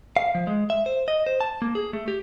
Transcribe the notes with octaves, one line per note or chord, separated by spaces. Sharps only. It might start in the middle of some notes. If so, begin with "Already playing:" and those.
F5
F3
G#3
E5
C5
D#5
C5
A5
A#3
G#4
A3
G4